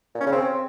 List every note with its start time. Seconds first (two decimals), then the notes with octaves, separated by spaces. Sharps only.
0.15 A#2
0.21 C#4
0.26 C#3
0.32 C4